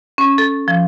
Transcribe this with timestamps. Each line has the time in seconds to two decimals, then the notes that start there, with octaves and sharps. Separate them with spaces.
0.18 C#4
0.38 A4
0.68 F3